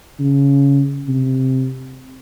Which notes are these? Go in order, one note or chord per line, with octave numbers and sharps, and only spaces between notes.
C#3
C3